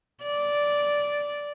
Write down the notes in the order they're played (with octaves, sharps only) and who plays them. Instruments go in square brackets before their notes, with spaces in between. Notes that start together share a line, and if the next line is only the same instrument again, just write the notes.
[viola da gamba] D5